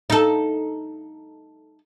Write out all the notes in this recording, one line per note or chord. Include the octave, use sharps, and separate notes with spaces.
D#4 A4